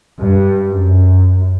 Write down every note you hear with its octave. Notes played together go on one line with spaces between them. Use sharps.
G2
F#2